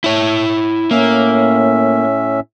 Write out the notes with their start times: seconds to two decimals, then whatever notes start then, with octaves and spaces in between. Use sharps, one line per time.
0.04 E4 C#5
0.91 A2 A#3 C#4 E5